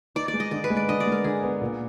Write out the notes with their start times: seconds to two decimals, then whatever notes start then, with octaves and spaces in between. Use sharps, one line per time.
0.15 D#4 D5
0.28 D5
0.33 G#3
0.40 D#5
0.51 D3 D5
0.64 B4
0.70 G#3
0.77 D5
0.89 D3 D#5
1.00 D5
1.06 G#3
1.12 A#4
1.24 D3 G#4
1.43 B3
1.61 A#2